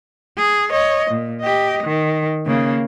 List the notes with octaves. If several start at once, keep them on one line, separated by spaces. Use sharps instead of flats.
G#4
C#5 D#5
A#2
G4 D#5
D#3
C#3 A#3